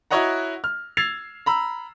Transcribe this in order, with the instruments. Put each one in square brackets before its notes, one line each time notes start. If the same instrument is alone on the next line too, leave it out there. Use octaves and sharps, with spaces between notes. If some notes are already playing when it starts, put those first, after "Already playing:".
[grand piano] E4 F#4 C#5 D#5 F#5 A#5
F6
E6 G#6 A6 C7 F7
A#5 B5 E6